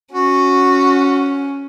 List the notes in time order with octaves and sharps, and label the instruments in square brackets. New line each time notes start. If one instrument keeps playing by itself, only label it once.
[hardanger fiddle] C#4 [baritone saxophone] F#4